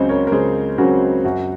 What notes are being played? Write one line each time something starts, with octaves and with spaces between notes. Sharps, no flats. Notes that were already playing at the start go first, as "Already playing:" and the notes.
Already playing: C#2 C#3 F#3 C4 C5 D#5
A#4 C#5
A#4
C#2 G#4 C5
C#3 F#3 C4 F#4 A#4
F#2 F#4